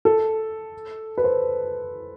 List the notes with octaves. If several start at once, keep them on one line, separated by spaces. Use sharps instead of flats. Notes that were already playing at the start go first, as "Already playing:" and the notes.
A4
B4
C5